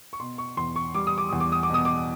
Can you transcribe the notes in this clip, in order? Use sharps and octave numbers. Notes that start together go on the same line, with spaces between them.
C#6
B2 C6
C#6
E2 C6
C#6
G3 D6
D#6
D6
E2 D#6
D6
D#6
D6
B2 D#6
D6